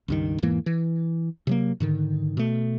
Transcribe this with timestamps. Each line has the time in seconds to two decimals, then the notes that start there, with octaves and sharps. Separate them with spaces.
0.08 C#2 G2 D#3
0.42 E2 G#2 E3 A#3
0.66 E3
1.47 C3 F#3 A#3
1.80 G#2 D3 D#3
2.37 B2 A3